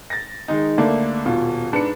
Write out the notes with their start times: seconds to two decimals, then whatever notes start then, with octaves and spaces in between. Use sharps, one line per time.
0.10 A6 A#6
0.48 D#3 G#3 D#4
0.78 D2 D3 A3 A#3 D5
1.25 D#1 B2 F4
1.72 G#2 D4 B4 C#7